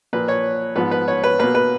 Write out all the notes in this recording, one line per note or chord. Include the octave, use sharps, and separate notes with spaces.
A#2 F3 A#3 B4
C#5
G#2 F3 B3 B4
B4
C#5
B4
B2 A#3 B4
B4